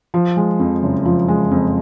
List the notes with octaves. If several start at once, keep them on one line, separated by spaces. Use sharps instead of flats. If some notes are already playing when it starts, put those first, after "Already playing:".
F3
G#3
F2
F#1
F3
G#3
F2